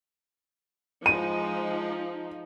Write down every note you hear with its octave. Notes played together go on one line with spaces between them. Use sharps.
F3 G#3 D#4 D#7